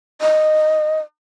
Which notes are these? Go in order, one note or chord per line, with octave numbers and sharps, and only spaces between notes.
D#5